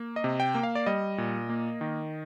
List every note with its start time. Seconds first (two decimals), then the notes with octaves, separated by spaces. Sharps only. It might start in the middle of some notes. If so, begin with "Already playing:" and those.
Already playing: A#3
0.16 D#5
0.24 C3
0.40 G5
0.55 A#3
0.63 F5
0.75 D5
0.86 G3 D#5
1.18 A#2
1.49 A#3
1.81 D#3